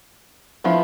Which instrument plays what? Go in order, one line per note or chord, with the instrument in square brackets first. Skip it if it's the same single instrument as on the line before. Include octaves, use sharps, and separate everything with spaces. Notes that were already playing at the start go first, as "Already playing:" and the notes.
[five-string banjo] F3 B3 E4